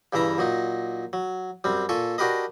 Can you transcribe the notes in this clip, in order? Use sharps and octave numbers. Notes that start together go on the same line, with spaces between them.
G2 C#3 E3 E5 A#5
A#2 F#3 D#4
F#3
F#2 G3 C4
A#2 A4 G#5 C#6
D4 F#4 G4 A#4 B4 D#5